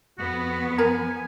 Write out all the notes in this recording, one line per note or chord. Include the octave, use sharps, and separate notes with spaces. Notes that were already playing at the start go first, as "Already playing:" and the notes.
F2 B3 F#4
A#4 G#5 A#5